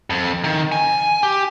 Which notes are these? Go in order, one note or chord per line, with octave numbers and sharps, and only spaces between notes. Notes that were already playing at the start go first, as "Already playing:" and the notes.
F2
D#3
G#5
G4